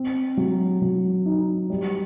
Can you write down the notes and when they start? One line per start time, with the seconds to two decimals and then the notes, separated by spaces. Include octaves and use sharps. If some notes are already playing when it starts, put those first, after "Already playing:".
Already playing: C4
0.37 F#3
0.82 F#3
1.26 D#4
1.70 G3